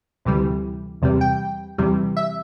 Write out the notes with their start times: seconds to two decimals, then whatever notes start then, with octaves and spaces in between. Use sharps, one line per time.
0.25 D2 C3 E3 G3
1.02 E2 C3 G3
1.21 G5
1.78 E2 C3 E3 G3
2.17 E5